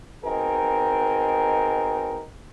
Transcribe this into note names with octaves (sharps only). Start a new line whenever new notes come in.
B2 C4 D#4 G#4 A#4